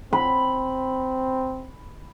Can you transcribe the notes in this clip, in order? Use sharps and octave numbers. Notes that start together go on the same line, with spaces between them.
C4 B5